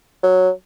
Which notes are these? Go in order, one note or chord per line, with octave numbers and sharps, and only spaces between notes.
F#3